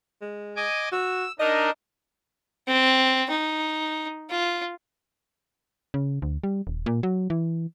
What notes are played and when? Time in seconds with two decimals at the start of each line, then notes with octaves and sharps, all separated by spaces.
0.22 G#3
0.56 D#5 G#5 D6
0.92 F#4 E6
1.39 D4 D#4 A#4 D#5
2.67 C4
3.30 D#4
4.30 F4
5.94 C#3
6.22 D2
6.44 G3
6.67 D#1
6.86 A#2
7.03 F#3
7.30 E3